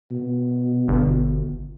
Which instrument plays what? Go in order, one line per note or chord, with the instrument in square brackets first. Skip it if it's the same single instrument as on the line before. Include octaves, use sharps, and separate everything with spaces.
[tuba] B2
[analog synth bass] G1